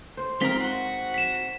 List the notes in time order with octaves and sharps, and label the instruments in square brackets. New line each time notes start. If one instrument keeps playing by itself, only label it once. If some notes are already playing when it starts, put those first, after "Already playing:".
[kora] C5
[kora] G#2 [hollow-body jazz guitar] C4 A#4 [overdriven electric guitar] F4 [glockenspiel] B6
[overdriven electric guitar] F#4
[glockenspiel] B6 E7